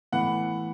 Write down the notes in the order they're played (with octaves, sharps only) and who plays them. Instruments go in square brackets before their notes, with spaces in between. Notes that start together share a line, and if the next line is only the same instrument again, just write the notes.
[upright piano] A2 E3 B3 F#5